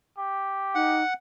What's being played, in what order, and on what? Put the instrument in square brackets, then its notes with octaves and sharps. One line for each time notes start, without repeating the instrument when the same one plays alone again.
[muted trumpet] G4
[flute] D#4 [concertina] F#5